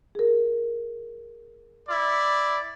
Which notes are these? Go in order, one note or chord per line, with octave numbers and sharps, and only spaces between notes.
G#4 A#4
E4 D5